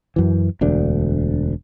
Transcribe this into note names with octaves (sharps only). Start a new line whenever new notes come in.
F#2 E3
E1 D2 D4